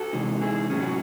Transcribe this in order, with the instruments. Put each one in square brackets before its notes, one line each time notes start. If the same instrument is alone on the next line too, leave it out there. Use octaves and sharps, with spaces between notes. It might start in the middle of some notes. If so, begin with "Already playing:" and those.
Already playing: [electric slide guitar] F#4 A4
C3 E3 G#3 D#4
E4 G#4
A2 F#3 C#4 G#4
F#4